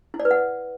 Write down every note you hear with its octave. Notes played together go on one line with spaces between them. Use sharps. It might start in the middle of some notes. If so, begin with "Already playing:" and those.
E4
D5
B4
F#5